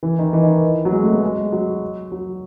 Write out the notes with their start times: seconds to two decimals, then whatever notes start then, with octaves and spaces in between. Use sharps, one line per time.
0.03 E3
0.19 D#3
0.33 E3
0.43 D#3
0.85 F#3
0.92 G#3
1.03 A3
1.12 B3
1.22 G#3
1.52 F#3
2.12 F#3